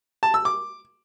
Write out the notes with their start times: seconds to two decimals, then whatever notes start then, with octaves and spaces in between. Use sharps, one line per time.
0.23 A5
0.34 E6
0.45 D6